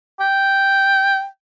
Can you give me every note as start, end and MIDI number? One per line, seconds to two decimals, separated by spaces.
0.20 1.26 79